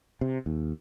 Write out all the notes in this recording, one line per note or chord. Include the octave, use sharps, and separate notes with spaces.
C3
D#2